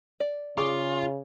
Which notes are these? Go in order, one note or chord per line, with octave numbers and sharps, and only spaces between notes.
D5
C#3 F4 G#4 C#6 D6